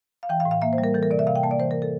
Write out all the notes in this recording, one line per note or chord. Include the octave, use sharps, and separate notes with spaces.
F5
E3 G5
F5
A2
F5
A#3 E5
C5
G3
A#4
E3 A4
A#4
C3 D5
E5
C3 F5
G5
A#3 A5
D5
E3 C5
A#4
A4